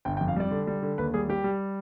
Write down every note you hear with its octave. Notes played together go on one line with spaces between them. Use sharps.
G1 G5
G5
F2
F5
G3 D5
D3
G3
D3
D#2 B4
G3 G#4
G3 G4
G3